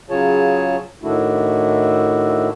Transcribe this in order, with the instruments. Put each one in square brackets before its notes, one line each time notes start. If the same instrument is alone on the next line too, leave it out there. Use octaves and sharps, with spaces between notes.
[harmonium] C#3 F#3 F4 G#4 C#5 A5
A2 D#3 A3 D4 E4 F#4